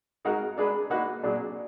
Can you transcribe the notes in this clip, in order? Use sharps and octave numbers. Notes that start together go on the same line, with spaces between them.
G#3 D#4 F#4 A#4
G#3 D4 G#4 B4
A#3 D#4 F#4 B4
A#2 F#3 D4 G#4